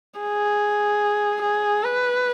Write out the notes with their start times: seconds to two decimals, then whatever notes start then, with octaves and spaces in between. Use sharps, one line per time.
0.20 G#4
1.42 G#4
1.84 B4